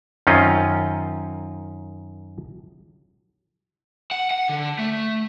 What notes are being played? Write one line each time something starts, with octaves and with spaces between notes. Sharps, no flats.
F#2 D#3 C4 C#4 F4 D#5
F#5
F#5
D3
A3